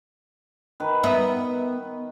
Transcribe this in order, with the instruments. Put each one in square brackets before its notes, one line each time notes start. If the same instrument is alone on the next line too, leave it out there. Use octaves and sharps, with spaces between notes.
[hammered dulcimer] D#3 B4
[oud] B3 E5